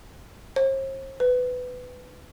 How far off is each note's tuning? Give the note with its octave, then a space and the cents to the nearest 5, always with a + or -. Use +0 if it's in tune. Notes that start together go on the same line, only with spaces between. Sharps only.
C5 +45
B4 +15